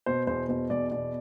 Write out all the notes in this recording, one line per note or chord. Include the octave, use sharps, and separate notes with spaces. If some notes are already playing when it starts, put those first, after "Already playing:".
B2 C5
E2 C5
B2 C5
E2 D5
B2 D5